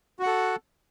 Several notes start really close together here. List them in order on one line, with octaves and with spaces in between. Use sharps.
F#4 F#5 A4